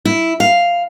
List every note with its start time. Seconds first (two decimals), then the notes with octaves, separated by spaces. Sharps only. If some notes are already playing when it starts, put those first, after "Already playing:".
0.05 E4
0.40 F5